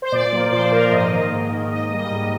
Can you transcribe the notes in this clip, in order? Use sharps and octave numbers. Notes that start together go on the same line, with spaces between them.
C5
A#2 D5
F3 A#3
D5
A#2 C5
F3 A#3 A#4
G#2 D#5
D#3 A#3
G#2
D#3 A#3
G#2 D#5
G3 A#3
D#5
G#2